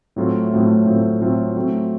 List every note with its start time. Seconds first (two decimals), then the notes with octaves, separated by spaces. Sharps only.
0.16 A2 F#3 A3 C4 F4
0.52 A2 F#3 A3 C4 F4
0.86 A2 F#3 A3 C4 F4
1.21 A2 F#3 A3 C4 F4
1.56 F#3 A3 C4